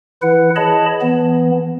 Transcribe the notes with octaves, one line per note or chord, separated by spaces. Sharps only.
E3 E4 B4 F#5
G#4 C#5 D#5 A5 B5
E3 B3